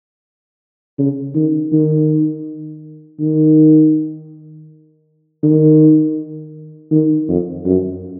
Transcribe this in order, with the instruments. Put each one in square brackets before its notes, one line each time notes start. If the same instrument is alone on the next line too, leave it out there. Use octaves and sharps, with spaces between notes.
[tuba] C#3
D#3
D#3
D#3
D#3
D#3
F2
F#2